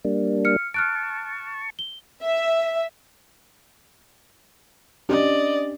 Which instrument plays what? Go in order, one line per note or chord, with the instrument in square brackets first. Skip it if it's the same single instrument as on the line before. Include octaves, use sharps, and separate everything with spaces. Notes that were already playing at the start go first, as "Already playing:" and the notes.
[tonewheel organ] G3 A#3 D4
[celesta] F6 C#7
[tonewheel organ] A5 C#6 [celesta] F6 F#6 D7
[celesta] G7
[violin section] E5
[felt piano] C#4 D4 G4 [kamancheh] D5 D#5